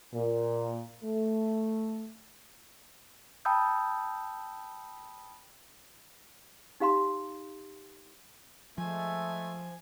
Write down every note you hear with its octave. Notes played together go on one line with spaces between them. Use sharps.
A#2
A3
G5 A5 B5 D#6 E6 G6
D#4 G4 F5 A#5 C6
F3 G#3 A3 G#5